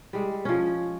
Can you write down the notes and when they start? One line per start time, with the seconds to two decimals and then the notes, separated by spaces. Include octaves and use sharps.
0.13 G3 G#3
0.45 F3 C#4